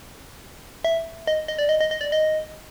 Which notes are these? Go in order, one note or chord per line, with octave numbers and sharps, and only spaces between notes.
E5
D#5
D#5
D5
D#5
D#5
D#5
D5
D#5